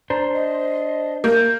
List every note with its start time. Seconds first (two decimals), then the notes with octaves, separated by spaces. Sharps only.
0.10 D4 C5 A#5
0.34 D#5
1.24 A#3 G6